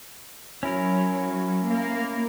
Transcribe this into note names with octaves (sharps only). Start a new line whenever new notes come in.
F#3 C#4 E4 A#4
A#3